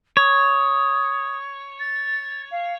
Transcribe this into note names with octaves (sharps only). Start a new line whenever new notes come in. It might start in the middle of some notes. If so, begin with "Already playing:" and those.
C#5 D#6
A6
F5